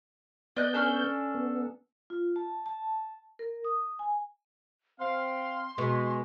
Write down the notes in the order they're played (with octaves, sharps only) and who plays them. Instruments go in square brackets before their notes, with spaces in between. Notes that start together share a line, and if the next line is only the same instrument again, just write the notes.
[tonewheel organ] B3 G6 [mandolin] D5 D#5 F#6
[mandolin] C#4 D4 A4
[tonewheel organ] B3
[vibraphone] F4
A5
A5
A#4
D#6
G#5
[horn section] C4 F5 [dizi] C6
[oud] B2 [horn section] G#3